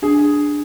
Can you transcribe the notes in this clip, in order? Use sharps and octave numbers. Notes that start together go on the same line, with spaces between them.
D4 G#4